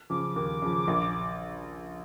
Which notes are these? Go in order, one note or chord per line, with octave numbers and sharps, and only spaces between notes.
C#3 F3 D6
D#2 D6
C#3 F3
A#1